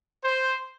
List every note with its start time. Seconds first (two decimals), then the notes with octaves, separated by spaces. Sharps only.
0.24 C5